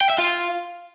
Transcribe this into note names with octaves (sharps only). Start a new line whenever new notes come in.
G5
E5
F4